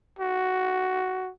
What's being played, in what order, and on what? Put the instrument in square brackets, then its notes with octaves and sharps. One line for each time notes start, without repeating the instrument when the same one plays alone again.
[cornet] F#4